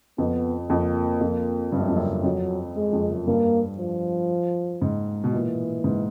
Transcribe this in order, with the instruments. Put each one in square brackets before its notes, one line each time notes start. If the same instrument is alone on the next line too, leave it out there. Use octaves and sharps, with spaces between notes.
[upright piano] F2 [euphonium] B3
[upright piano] F2 [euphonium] A#3
[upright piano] F2
G2
F#2
F2
F#2
[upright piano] F2 [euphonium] F#3
[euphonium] G#3
[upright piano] F2
F#2
[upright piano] G2 [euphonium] A#3
[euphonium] F3
[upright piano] G#2
B2
[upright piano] A#2 [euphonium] E3
[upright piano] G#2